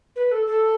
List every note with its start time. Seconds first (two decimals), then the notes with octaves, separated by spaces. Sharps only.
0.16 B4
0.31 A4
0.47 A4